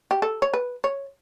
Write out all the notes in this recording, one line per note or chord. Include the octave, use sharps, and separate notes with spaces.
G4
A4
C#5
B4
C#5